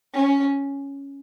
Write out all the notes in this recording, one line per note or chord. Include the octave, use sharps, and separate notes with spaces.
C#4